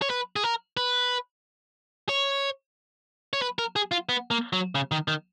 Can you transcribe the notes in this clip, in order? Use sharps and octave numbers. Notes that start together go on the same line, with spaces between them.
C#5
B4
G#4
A#4
B4
C#5
C#5
B4
A#4
G#4
F4
B3
A#3
F#3
C#3
D#3
D#3